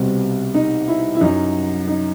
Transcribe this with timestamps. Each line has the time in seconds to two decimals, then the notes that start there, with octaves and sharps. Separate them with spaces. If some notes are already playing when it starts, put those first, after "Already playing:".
Already playing: C2 B2 G3 C4
0.54 D#4
0.88 E4
1.15 E4
1.21 F#2 F#3 D#4
1.88 D#4